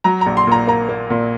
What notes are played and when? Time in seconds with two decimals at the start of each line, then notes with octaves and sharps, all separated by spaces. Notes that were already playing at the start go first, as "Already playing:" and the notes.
0.04 F#3 A#5
0.21 A#1 A#5
0.37 C6
0.47 A#2 A#5
0.67 A#3 A#5
0.89 A#3
1.10 A#2